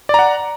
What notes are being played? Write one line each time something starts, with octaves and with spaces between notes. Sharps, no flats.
D5 F#5 A#5